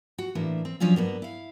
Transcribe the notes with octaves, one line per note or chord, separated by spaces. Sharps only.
F#4
A2 E3 A#3 D4 E5
C4
F3 F#3 C#4 D4 F4
G2 A#3 B3
E4 F5